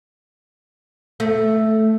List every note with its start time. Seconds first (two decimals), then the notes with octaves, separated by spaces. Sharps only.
1.20 A3